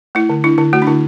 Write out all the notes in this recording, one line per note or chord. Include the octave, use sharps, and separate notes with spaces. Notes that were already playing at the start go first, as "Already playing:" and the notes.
A3 E4
D3
D4 E4
D3 E4
A3 F#4
D4
D3 E4